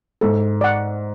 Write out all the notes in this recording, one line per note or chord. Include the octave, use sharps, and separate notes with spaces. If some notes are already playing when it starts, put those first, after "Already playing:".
G#2 A4
D5 F#5